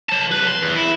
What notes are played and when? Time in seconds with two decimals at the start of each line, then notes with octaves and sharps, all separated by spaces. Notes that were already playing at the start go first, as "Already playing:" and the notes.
0.09 F#3 A5
0.31 C2 B4
0.47 C6
0.62 E2
0.75 E4